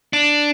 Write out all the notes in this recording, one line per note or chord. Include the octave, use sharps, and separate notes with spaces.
D4